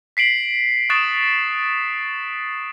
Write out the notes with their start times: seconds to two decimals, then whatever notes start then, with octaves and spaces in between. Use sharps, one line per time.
0.17 B6 C7 D7 F#7
0.90 C#6 D#6 F#6 A6 D7 E7